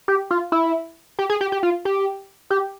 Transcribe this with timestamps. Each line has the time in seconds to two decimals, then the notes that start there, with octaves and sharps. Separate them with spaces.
0.08 G4
0.31 F4
0.52 E4
1.19 G4
1.30 G#4
1.41 G4
1.52 G4
1.63 F4
1.85 G4
2.50 G4